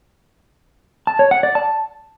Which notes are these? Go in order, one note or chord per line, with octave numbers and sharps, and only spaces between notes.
A5
C#5
F#5
D5
A5